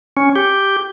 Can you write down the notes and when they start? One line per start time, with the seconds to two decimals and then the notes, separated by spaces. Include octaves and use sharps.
0.17 C#4
0.36 G4